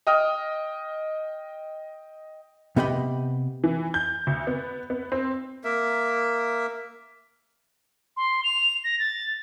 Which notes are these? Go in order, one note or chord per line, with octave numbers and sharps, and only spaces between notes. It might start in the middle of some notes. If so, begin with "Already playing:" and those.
D#5 G5 D#6 F6
C3 B3 G4 D#5 G5 B5
E3
G6
D2
B3
B3
C4
A#3 A#4 E5
C6
F7
A#6
A6